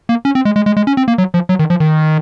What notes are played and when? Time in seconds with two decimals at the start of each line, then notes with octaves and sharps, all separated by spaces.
0.09 A#3
0.25 C#4
0.35 C4
0.45 G#3
0.56 G#3
0.66 G#3
0.77 G#3
0.87 C#4
0.97 C4
1.08 A#3
1.18 F#3
1.34 F3
1.49 F#3
1.59 D#3
1.70 F3
1.80 D#3